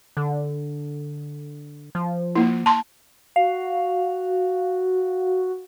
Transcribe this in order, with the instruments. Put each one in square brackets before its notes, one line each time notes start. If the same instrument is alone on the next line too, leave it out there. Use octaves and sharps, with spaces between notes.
[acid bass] D3
F3
[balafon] A#3 E4
A5 C6
[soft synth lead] F#4 [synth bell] F5